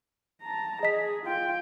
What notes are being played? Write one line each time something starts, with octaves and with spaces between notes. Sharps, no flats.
A5 A#5
G#4 D#5 B6
F4 G5